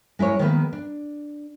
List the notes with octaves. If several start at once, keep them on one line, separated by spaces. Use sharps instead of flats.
G#3 E4 A#4 C#5
D#3 F3 G#3 A#3 B3 B4
D4